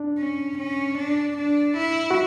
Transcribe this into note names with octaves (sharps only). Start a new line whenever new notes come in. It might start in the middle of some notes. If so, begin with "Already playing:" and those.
Already playing: D4
C#4
C#4
D4
D4
E4
F#4